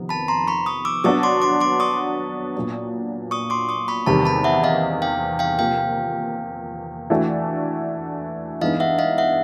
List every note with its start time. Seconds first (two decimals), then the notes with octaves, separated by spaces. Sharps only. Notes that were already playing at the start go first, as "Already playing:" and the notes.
Already playing: F2 C3 D#3 B3
0.09 A5 B5
0.28 A#5 C6
0.47 B5 C#6
0.66 C#6 D#6
0.85 D6 E6
1.04 F#3 B3 D4 F#4 C#6 D#6
1.23 C6 D6
1.42 C6 D6
1.61 C6 D6
1.80 C#6 D#6
2.56 A#2 F#3 B3 D4
3.31 C#6 D#6
3.50 C6 D6
3.69 C#6 D#6
3.88 B5 C#6
4.06 E2 C3 D#3 G3 A5 B5
4.25 A5 B5
4.44 E5 F#5
4.64 D#5 F5
5.02 F5 G5
5.39 F5 G5
5.58 C3 F3 A#3 F5 G5
7.10 E3 A3 D4 F#4
8.61 G2 E3 G#3 B3 D#4 D#5 F5
8.80 E5 F#5
8.99 D#5 F5
9.18 E5 F#5